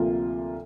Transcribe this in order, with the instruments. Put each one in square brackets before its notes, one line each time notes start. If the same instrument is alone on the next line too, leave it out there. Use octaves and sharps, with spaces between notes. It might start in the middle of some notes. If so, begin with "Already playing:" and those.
Already playing: [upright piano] D2 C3 F3 A#3 F4